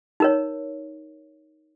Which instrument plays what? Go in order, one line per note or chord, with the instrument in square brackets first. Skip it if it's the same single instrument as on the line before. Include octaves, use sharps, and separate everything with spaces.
[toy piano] D#4 A#4 C#5